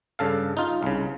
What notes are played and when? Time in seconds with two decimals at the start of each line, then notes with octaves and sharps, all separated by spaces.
0.19 G2 C#3 A4 F5
0.57 D#4 F4
0.83 C2 C#3